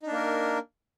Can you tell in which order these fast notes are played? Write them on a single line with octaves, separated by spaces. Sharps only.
D#4 D4 A#3 A#4